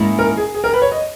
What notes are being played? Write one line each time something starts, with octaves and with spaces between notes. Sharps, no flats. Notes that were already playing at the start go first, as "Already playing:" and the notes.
Already playing: G#2 D#3 A#3 C#4 E4
A#4
G#4
G#4
A#4
B4
C#5
D#5